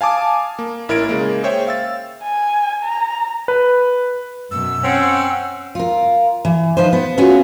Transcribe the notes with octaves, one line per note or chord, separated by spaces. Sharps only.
F5 G#5 A5 D6 D#6
A#3
A1 E4 A#4 G#6 A6 D7
C#3 G#3 A#3
G#4 C5 C#5 E5 G5
F5 E6 A6
G#5
A#5
B4
F#2 B2 E6
C4 C#4 F#5
F4 A#4
E3
F3 D#4 B4 C5
B3
A3 B3 C#4 F4 F#4 G#4